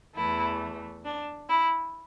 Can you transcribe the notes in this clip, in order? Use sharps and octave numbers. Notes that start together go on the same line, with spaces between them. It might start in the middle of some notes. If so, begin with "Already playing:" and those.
E2 E3 A3 E4
D4
E4